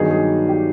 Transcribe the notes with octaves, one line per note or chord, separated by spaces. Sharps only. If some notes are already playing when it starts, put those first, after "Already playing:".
Already playing: G2 D#3 F#3 B3 D#4 G#4
G#4
G4